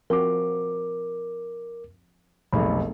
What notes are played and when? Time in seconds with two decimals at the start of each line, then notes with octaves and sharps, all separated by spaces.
0.10 F3 C4 F#4 A#4 D6
2.53 F1 B1 G#3 A3 D#4 B5